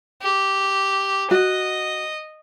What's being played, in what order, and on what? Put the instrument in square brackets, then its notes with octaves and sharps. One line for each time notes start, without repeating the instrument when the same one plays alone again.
[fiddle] G4
[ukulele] F#4 [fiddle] D#5